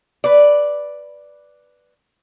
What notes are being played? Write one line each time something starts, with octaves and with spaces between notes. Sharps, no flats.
B4 D5